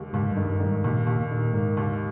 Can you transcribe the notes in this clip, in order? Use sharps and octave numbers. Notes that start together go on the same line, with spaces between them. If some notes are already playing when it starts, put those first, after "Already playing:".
Already playing: D#2 G#3
D#2 G#2
G2 D#3
G2
D#3
G#2
D#2 A#2
D#2
A#2
D#3
G#2 A#3
D#2